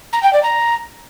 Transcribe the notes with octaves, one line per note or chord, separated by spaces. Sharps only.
A#5
G5
D5
A#5